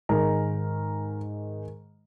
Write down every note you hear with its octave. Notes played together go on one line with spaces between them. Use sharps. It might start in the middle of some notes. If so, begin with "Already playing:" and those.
G#2 D#3 G#3 A#4 A#5